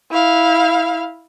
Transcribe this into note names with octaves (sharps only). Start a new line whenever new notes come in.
E4 F5